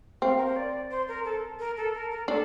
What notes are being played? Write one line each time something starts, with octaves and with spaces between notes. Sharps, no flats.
C4 F5
A#4
C5
D5
C5
A#4
A4
A#4
A4
A#4
A#4
D4 A4